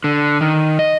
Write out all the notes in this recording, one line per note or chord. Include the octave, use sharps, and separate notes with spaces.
D3
D#3
D#5